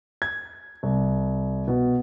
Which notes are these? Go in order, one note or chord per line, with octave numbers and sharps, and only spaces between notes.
G#6
C2
B2